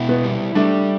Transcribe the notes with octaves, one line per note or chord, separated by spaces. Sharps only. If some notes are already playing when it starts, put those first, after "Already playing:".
Already playing: B2 E4
B3
G3
G3 A3 D4